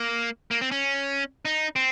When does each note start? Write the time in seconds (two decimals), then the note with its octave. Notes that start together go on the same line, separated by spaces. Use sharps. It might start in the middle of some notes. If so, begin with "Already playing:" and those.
Already playing: A#3
0.51 A#3
0.61 C4
0.71 C#4
1.45 D#4
1.76 C4